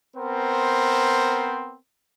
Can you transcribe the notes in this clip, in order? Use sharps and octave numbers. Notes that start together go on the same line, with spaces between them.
B3 C4 A#4 C5